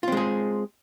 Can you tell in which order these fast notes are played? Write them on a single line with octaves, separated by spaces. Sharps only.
F4 C4 G#3 G#4